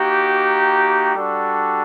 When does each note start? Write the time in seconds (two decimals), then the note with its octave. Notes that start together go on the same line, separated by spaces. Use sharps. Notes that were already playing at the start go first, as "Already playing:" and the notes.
Already playing: A#3 D#4 F#4 G4
1.15 G3 D4 F#4 A4